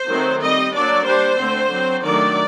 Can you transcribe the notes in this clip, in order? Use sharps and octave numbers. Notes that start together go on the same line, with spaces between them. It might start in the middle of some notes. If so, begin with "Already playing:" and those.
Already playing: C5
D#3 F#3 A3 C4
G3 C4 D#5
F#3 A#3 D4 D5
G3 D4 C5
D3 A3 C4
F#3 C4
D#3 F#3 A3 D4 D5